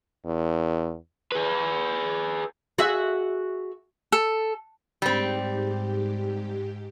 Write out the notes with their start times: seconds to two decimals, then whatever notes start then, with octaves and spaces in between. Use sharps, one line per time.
0.25 E2
1.32 G#4 B4
2.78 F#4 G#4 E5
4.12 A4
5.02 G#2 G3 C4 G4